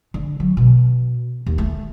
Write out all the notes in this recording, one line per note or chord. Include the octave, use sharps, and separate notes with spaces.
D3
F#3
B2
D#2
A3